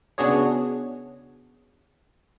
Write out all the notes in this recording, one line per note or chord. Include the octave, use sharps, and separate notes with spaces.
C#3 B3 D4 F#4 G#4 C#5